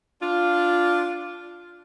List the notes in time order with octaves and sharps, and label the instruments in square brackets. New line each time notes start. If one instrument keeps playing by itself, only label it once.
[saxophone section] D4 F4